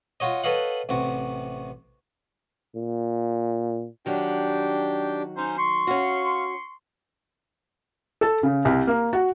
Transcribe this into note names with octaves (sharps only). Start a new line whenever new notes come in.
F4 F#4 C#5 D#5
A4 B4 C#5 D#5 F5 F#5
A1 C3 F#4
A#2
D#3 F#3 D4 G4 G5
C#4 D#4 C5
C6 C#6
C#4 F#4 F5
A4
C#3
C2
A#3
F#4